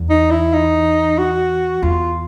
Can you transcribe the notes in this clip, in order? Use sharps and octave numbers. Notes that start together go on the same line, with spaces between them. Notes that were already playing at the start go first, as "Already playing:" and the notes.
Already playing: E2
D#4
E4
D#4
F#4
E2 F4